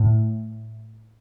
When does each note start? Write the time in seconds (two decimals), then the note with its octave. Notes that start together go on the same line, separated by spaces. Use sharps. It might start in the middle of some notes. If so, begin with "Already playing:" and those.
Already playing: A2